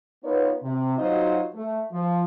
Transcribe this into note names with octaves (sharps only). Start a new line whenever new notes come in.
B3 D#4 F4 A#4 B4 C#5
C3
F#3 D#4 F4 F#4 C5 D#5
A3
F3